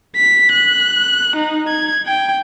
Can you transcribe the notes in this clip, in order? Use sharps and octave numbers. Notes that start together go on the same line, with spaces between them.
B6
F#6
D#4
G#6
G5